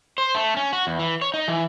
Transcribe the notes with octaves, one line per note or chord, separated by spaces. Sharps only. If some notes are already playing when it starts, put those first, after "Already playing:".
C5
A3
C#4
F#4
E2
E3
C#5
D#4
E3